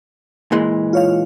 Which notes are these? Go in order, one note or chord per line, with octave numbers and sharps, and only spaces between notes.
A#2 E3 G#3
F4 C#5 F5